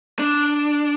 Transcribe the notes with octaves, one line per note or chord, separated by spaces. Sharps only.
D4